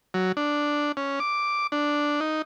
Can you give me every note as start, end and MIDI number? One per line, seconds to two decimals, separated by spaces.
0.14 0.32 54
0.37 0.92 62
0.97 1.20 61
1.20 1.67 86
1.72 2.20 62
2.20 2.42 63